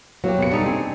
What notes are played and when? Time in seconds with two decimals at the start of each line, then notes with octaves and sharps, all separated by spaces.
0.24 F#3 A#3 F#4 G4
0.38 B2 A#3 C#7
0.51 G3 D4 D#4 A4
0.66 C3 C4 G#4